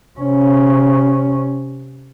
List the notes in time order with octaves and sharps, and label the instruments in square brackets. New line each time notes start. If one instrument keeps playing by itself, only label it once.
[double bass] C3 C#4